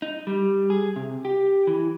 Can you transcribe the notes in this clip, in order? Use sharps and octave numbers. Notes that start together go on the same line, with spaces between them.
D#4
G3
G#4
C3
G4
E3